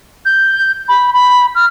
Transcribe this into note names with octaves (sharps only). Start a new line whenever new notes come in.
G6
B5
B5
F6